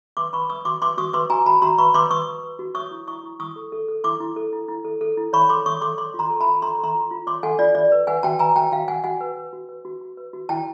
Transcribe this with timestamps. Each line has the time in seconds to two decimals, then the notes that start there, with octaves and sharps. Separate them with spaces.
0.17 B4 C6 D6
0.33 B4 B5 C#6
0.49 B4 C#6 D#6
0.65 F#4 C6 D6
0.82 B4 C6 D6
0.98 F#4 C#6 D#6
1.13 B4 C6 D6
1.30 F#4 G#5 A#5
1.46 F#4 A5 B5
1.62 F#4 A#5 C6
1.78 B4 B5 C#6
1.94 B4 C6 D6
2.11 B4 C#6 D#6
2.27 B4
2.43 B4
2.59 F#4
2.75 C#5 C#6 D#6
2.91 E4
3.07 E4 C#6 D#6
3.24 E4
3.39 E4 C#6 D#6
3.56 A4
3.72 A4
3.88 A4
4.04 E4 C6 D6
4.20 E4
4.36 A4
4.53 E4
4.68 E4
4.85 A4
5.01 A4
5.17 E4
5.33 C#5 B5 C#6
5.49 A4 C6 D6
5.66 C#5 C#6 D#6
5.81 A4 C6 D6
5.98 C#5 C6 D6
6.14 F4
6.19 A#5 C6
6.30 A4
6.40 A5 B5
6.46 F4
6.62 A4 A#5 C6
6.78 A4
6.84 A#5 C6
6.95 F4
7.11 F4
7.27 C#5 C6 D6
7.43 A4 F#5 G#5
7.59 F4 D5
7.75 F4 D5
7.92 B4
8.07 B4 F#5 G#5
8.23 F#4 G5 A5
8.39 B4 G#5 A#5
8.56 F#4 G5 A5
8.72 F#4 F5 G5
8.88 F#4 F#5 G#5
9.04 F#4 F#5 G#5
9.21 B4
9.37 B4
9.53 F#4
9.69 B4
9.85 F#4
10.01 F#4
10.17 B4
10.33 F#4
10.49 E4 G5 A5